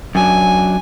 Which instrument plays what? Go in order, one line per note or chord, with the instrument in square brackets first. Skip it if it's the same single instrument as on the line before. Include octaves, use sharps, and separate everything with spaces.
[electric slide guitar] F#2 F#3 D4 [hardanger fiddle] G#5